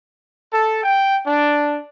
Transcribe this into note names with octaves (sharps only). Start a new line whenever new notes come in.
A4
G5
D4